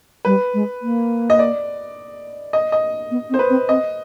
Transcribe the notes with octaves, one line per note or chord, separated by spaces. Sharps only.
G3 B4
G#3
A#3
D#5
D5
D#5
D#5
B3
C4
C5
B4
C4
C4 D#5